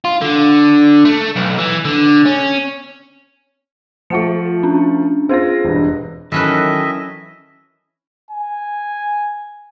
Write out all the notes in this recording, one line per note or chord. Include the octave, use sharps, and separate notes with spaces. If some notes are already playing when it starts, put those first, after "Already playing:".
F4
D3
A3
B1
E3
D3
C#4
F3 A3 F4 F#5 C#7
C#4 D4
C4 F4 G#4 C5 A#6
E1 G2
D#3 E3 F#3 C#4 A4 B4 D#5 E5
G#5